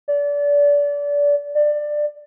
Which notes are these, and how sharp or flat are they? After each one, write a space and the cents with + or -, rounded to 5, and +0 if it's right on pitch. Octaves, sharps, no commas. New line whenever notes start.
D5 -30
D5 +15